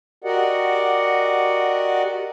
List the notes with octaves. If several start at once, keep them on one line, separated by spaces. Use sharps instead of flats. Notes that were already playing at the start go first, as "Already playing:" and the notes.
F#4 G4 A#4 D5 D#5 F#5